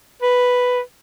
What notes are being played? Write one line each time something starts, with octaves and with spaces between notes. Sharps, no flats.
B4